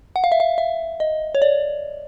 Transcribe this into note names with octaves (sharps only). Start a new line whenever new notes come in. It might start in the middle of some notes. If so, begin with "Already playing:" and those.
F#5
F5
E5
F5
E5
D#5
C#5
D5